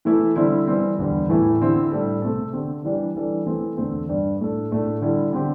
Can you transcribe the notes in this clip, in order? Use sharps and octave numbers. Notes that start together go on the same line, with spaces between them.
E3 A3 E4 A4
D3 G3 C4 E4 A4
E3 G3 C4
E2 D3 G3
A2 E3 A3 E4
D3 C4 E4 G4
A2 G3 D4 A4
C3 A3 C4 A4
D3 C4 G4
E3 G3 D4 G4
E3 G3 D4 A4
E3 A3 C4 A4
E2 D3 A3 C4
G2 G3 D4
A2 A3 D4 A4
A2 A3 D4 A4
D3 G3 E4 A4
D3 C4 G4